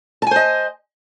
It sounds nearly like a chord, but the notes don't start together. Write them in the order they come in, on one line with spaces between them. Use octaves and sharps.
A5 G#5 C5 D#5